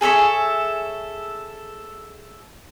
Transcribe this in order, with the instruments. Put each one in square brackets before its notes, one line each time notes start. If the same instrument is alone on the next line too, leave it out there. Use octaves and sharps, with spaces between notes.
[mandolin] G#4 A4 C#5 E5